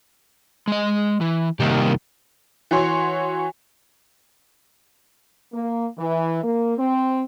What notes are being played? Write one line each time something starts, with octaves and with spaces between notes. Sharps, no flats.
G#3 D#5
E3
C2 D#3 A#3 G4
E3 F#4 C#5 C6
A#3
E3
A#3
C4